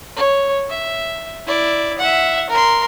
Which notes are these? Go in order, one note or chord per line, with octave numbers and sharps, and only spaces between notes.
C#5
E5
E4 D5
E5 F#5
A#4 C6